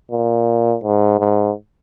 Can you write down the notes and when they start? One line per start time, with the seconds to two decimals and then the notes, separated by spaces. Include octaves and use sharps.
0.12 A#2
0.84 G#2
1.19 G#2